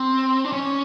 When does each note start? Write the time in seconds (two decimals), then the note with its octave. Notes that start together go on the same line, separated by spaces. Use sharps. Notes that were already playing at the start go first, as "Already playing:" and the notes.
Already playing: C4
0.45 D4
0.53 C#4